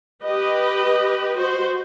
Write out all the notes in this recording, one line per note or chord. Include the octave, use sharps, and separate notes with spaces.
G4 B4 D#5
F#4 C5